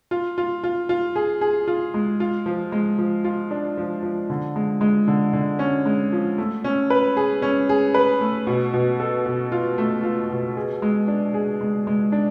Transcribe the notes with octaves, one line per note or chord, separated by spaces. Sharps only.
F4
F4
F4
F4
G#4
G#4
F4
G#3
F4
F3
G#3
F3
F4
D4
F3
F3
D3
G#3
G#3
D3
D3
C#4
G#3
F3
A3
C#4
B4
G#4
C#4
G#4
B4
A3
B2
B2
A4
B2
F4
A3
F4
B2
G#4
G#3
D4
G#4
G#3
G#3
D4